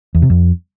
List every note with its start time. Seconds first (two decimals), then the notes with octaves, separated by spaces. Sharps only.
0.15 E2
0.22 C3
0.30 F2